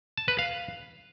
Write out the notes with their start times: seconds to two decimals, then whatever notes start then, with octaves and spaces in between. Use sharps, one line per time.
0.17 A5
0.28 B4
0.39 F5